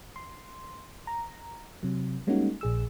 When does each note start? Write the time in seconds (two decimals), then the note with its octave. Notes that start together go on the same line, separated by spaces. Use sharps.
0.16 C6
1.07 A#5
1.83 C3 F#3
2.27 G3 G#3 A#3 C#4 D#4 F#4
2.61 A#1 G#4 E6